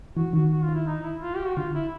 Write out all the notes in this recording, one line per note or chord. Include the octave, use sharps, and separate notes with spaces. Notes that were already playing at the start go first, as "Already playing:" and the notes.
E3 F#4
D#3 F#4
F#4
F4
D#3
E4
D#4
E4
F4
G4
F#4
D3 F4
E4